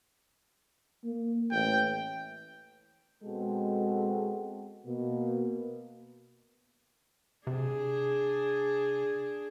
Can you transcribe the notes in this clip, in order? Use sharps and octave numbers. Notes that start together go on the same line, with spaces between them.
A#3
A1 G5
B2 G#3 C4 F#4 A4
B2 A#3
C3 D4 G#4